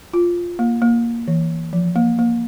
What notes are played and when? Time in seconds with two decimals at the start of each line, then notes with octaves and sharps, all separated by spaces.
0.14 F4
0.59 A#3
0.82 A#3
1.28 E3
1.73 F3
1.96 A#3
2.19 A#3